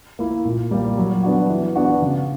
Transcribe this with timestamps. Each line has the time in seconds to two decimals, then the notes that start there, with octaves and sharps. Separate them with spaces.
0.19 A#3 E4
0.45 A#2
0.71 G3 A#3
0.98 F#3
1.23 B3 D4 F#4
1.49 E3
1.76 B3 D4 F#4
2.02 C#3